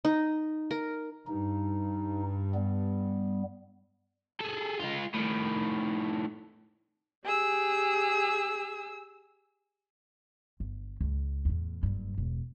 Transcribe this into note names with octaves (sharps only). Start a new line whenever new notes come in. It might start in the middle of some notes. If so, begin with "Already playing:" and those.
D#4
A#4
G2 D#4
G3 B3
G#4 A4
G#3 F4
A2 D#3
G4 G#4 E6
G1
C#2
E2 A2
F#1 G2
E1